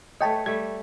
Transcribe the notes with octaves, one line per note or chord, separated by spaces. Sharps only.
A3 B4 C#5 D#5 G5 A5
G3 A3 G#6